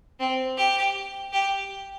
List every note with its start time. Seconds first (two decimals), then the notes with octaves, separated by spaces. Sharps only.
0.19 C4
0.57 G4
1.32 G4